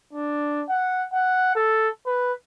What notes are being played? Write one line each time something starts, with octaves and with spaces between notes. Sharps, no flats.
D4
F#5
F#5
A4
B4